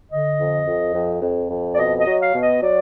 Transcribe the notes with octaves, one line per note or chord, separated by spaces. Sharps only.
D3 D#5
F2
F2
F2
F2
F2
D5
B2 D#5
D#5
F#3
F5
B2
D#5
F#3 D5